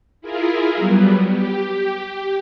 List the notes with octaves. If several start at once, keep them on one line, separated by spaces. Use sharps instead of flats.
E4 F4 G#4 A#4
F#3 G3 B3
G4